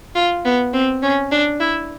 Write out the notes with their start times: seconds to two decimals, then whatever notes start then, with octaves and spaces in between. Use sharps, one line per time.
0.15 F4
0.45 B3
0.74 C4
1.03 C#4
1.32 D4
1.60 E4